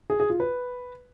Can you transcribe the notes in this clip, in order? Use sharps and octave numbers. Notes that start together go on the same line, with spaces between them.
G#4
G#4
F4
B4